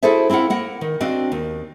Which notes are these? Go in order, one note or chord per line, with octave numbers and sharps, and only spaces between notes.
E4 F#4 G#4 A4 C5 E5
C4 E4 F4 F5 F#5
A#3 F#5
D#3
C4 D4 F#4 D#5 F5
D#2